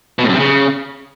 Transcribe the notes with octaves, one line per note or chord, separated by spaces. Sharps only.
B2
A2
F#2
C3
C#3